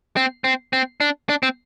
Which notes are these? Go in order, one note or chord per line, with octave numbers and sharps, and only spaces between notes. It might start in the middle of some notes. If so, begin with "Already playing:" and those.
C4
C4
C4
D4
D4
C4